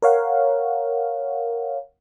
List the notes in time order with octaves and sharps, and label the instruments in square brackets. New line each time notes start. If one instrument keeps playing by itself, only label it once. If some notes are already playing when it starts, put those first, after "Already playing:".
[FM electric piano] A#4 C#5 F5 F#5